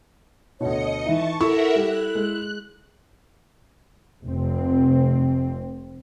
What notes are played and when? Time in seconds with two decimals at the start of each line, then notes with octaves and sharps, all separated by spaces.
0.61 D2 B2 C#5 D#5 C#7
1.06 E3 D#4 E5 A5 C#6
1.41 E4 A4 A#4 E5 F#5 C#6
1.76 G3 G4 F#6
2.15 G#3
4.23 F1 C4